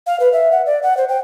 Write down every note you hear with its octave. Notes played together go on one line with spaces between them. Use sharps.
F5
B4
E5
F#5
D5
F#5
C5
G5